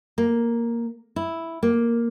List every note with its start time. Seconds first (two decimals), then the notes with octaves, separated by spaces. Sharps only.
0.18 A#3
1.16 E4
1.63 A#3